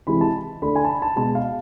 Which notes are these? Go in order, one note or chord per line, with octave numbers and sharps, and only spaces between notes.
C3 E3 G#3 B5
A5
D3 A3 B5
G#5
A5
B5
A5
B2 G#3 A5
F5